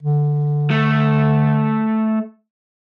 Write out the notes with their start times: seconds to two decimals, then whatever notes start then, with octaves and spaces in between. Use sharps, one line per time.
0.03 D3
0.71 A3